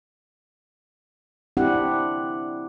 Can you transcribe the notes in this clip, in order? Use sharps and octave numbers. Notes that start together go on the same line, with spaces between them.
C4 D4 E4 G4 F#5